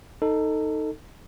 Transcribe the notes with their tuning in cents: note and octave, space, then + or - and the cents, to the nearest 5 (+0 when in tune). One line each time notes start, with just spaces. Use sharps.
D#4 +0 A4 +15